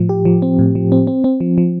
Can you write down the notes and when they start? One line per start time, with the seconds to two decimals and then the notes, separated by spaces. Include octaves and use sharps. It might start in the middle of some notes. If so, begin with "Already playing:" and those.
Already playing: A2 F3
0.09 G4
0.25 F3
0.42 C4
0.59 A2
0.75 F3
0.92 C4
1.07 C4
1.24 C4
1.41 F3
1.58 F3